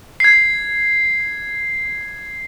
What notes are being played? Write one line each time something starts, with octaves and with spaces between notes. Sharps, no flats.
G#6 C7